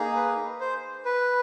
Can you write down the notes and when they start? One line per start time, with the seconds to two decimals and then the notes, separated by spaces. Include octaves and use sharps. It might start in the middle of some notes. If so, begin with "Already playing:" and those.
Already playing: A#3 D#4 G#4
0.16 B4
0.60 C5
1.05 B4